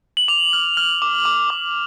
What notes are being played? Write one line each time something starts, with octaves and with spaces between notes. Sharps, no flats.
F#7
D6 F7
F6
F6
D6
D6
D6